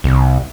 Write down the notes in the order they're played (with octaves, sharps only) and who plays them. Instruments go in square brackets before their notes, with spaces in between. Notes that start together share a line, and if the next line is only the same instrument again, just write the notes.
[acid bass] C2